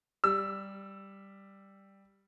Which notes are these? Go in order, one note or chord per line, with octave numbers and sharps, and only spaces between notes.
G3 E6